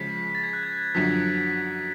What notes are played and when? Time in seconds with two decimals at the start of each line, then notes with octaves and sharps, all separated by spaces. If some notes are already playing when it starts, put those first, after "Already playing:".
Already playing: C#3 F3 G#3 B6
0.35 A6
0.43 G#6
0.53 F#6
0.63 G#6
0.95 F#2 D3 F3 B6